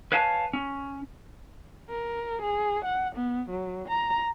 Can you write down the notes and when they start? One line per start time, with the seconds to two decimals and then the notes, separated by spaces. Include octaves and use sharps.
0.12 B4 C#5 F5 G#5 A5
0.53 C#4
1.89 A#4
2.42 G#4
2.85 F#5
3.15 B3
3.50 F#3
3.88 A#5